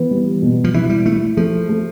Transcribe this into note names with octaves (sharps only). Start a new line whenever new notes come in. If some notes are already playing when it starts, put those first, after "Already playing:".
Already playing: E3 B3
G3
B2
F3
E3 E4
G3
A3 E4
F3 A3
A3